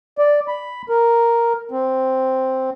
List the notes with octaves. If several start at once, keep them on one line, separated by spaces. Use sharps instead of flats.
D5
B5
A#4
C4